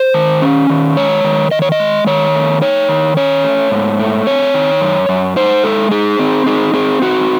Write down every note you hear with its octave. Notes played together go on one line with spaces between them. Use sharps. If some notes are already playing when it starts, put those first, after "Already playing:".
Already playing: C5
D#3
C#4
D#3
G#3 C#5
D#3
D#3 D#5
C#5
D#5
G#3
D#3 C#5
A3
D#4 C#5
D#3
C#4 C#5
A3
G#2
A3
C4 C#5
D#3
F#2
F#2
D#4 C5
G#3 A4
D#4 G#4
C4
D#4 G#4
C4 G#4
D#4 F#4